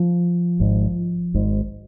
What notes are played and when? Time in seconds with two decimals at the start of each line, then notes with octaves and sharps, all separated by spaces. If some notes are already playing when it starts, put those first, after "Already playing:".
Already playing: F3
0.60 G#1 G#2
1.34 G#1 G#2